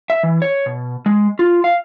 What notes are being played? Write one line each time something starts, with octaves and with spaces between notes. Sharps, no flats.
E5
E3
C#5
B2
G#3
F4
F5